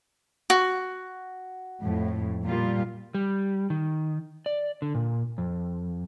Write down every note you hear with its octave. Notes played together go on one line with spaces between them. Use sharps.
F#4
F2 A2
A#2 G3 F4
G3
D#3
D5
D3
A#2
F2